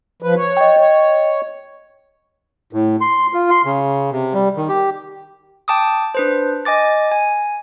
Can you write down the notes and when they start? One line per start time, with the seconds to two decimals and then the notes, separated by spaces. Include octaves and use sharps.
0.22 F3 B4
0.37 C#5
0.57 D#5 G5
0.80 C#5
2.73 A2
3.01 C6
3.34 F4
3.51 C6
3.65 C#3
4.12 C3
4.34 G3
4.57 D#3
4.69 G4
5.68 G5 A5 D6 D#6
6.15 D4 B4 C5
6.65 D#5 G#5 D6 A6
7.11 G#5